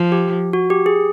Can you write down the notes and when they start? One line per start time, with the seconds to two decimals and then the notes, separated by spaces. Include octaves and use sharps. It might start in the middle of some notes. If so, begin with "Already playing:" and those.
Already playing: F3
0.12 G4
0.53 F#4
0.70 G4
0.86 G#4